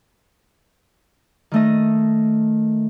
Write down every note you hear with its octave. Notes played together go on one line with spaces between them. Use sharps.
D#3 A3 D#5